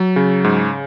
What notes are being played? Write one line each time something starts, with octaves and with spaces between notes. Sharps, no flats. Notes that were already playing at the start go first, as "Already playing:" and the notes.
Already playing: F#3
C#3
G#2